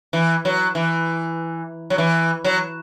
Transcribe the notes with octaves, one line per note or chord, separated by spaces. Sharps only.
E3
F#3
E3
F#3
E3
F#3